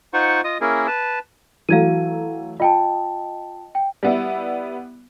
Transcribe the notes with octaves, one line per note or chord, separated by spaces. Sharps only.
D#4 F4 C5 F#5 C#6
F4 D#5 D#6
A#3 C#4 E4 G#4 A#4
B4 A5
E3 F#3 A3 F5 G#6 D#7
F4 D#5 G5 A5
G5
G3 B3 E4